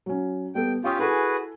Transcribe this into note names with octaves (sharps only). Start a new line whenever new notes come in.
F#3 C#4
G3 B3 A4 G5
C#4 F4 G4 F5 C#6 D#6
E4 F#4 G#4 A4 B4 G#5